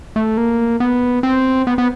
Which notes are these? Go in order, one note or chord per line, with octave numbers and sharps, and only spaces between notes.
A3
A#3
B3
C4
B3
B3